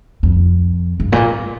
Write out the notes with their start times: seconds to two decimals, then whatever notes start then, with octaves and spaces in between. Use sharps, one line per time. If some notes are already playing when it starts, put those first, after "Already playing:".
0.23 F2
1.00 G2
1.12 A#2